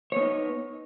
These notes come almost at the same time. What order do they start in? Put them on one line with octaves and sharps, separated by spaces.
C#5 B3 D#4